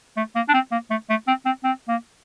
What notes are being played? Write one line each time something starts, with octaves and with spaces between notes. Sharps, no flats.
A3
A#3
D4
C4
A#3
A3
A3
C4
C4
C4
A#3